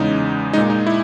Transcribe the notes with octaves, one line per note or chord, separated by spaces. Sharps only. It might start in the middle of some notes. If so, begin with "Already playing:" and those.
Already playing: E2 C#3 G#3 D#4
A#2 G#3 D#4
D#4
E4